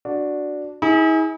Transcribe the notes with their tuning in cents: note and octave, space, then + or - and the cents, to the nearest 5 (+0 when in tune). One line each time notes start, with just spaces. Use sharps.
D4 +0 F#4 -15
E4 -45 G#4 +0